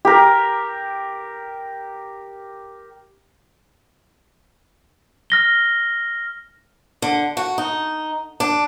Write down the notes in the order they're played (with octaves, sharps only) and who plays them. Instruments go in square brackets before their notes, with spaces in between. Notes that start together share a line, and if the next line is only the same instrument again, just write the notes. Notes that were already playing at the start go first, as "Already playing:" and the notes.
[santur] G4 A#4
[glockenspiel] F6 A#6 G7
[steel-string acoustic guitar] D3
F#4
D#4
D4